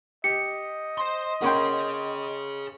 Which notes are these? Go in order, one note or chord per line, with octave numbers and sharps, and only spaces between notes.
G4 D#5 C#7
C5 C6
A#3 C#4 G#4 C#5 F#5 G5 C6